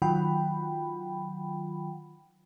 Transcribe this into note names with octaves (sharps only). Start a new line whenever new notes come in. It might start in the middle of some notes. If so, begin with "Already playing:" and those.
D#3 F#3 F4 F#5 G5 B5